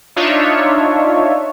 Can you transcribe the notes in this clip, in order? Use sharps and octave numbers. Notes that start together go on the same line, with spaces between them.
D4 D#4 F4 C#5 E5